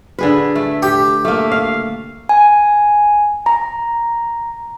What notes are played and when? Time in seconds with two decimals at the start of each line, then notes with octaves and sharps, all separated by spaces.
0.19 D3 G#4 B4
0.56 A3
0.83 G4
1.25 A3 A#3
1.52 F5
2.29 G#5
3.46 A#5